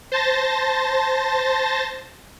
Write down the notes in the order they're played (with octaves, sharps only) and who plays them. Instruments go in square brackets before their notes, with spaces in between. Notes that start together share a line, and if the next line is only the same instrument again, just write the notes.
[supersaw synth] C5 A5 A6 A#6